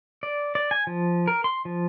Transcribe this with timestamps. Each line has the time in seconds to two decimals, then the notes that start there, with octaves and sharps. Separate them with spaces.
0.23 D5
0.55 D5
0.71 G#5
0.87 F3
1.28 A#4
1.44 C6
1.65 F3